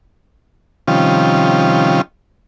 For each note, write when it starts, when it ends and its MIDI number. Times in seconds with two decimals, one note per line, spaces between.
0.88 2.01 48
0.88 2.01 51
0.88 2.01 53
0.88 2.01 55
0.88 2.01 61
0.88 2.01 65